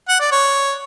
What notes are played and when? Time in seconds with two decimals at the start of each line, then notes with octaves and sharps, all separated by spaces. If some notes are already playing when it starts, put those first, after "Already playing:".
0.09 F#5
0.20 D5
0.32 C#5